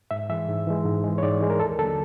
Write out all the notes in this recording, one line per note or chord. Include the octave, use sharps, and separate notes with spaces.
G#2 E5
E3 G#3 E5
G#2
E3 G#3
G#2
E3 G#3
C#5
G#2 D5
E3 G#3
A#4
D#2 A4
D3 F#3 A#3 A4